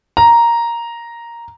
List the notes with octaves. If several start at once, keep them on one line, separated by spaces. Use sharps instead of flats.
A#5